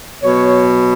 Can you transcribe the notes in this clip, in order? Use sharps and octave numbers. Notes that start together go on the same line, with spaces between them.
B2 F#3 C#5